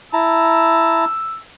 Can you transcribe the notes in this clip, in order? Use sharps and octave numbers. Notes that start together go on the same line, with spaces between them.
E4 A5 A#5 E6